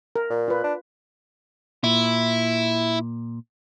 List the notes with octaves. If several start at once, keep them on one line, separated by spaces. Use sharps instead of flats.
A#4
A#2
F4 B4
D4
A#2 E4